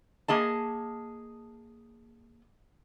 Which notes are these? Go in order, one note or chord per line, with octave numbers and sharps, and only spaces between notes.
A#3 G#4 D#5 A5